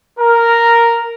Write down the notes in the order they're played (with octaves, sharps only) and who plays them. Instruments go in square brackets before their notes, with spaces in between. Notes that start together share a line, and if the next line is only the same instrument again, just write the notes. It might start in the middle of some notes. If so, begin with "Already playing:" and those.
[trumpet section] A#4